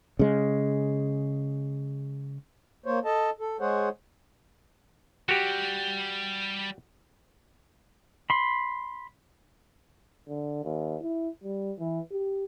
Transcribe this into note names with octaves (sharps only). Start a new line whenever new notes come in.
C#3 G#3
A#3 C5 C#5
A4 D#5 A5
A4
G#3 G#4 C5 C#5 F#5
G3 F#4 G4
B5 C6
D3
D#2
E4
G3
E3
G4